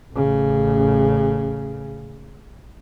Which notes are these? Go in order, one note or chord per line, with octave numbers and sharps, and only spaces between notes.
A1 C#3